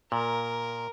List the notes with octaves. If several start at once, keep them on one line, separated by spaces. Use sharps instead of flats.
A#2 A#4